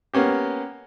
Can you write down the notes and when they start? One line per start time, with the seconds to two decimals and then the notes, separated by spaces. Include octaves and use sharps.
0.14 A#3 B3 C#4 G4